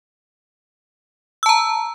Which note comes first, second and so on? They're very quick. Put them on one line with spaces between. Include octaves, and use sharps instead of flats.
E6 A5 A#5